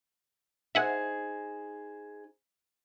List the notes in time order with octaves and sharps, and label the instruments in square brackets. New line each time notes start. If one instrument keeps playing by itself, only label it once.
[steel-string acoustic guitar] D#4 G#4 C5 [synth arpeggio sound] E5 F#5 G#5